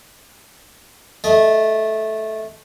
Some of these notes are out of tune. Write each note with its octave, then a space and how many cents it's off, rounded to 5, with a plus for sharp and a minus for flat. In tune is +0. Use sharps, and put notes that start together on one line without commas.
A3 -10 D#5 +15